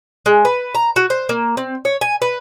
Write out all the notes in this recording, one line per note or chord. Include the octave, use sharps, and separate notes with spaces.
G#3
B4
A#5
F#4
C5
A#3
C4
C#5
G#5
B4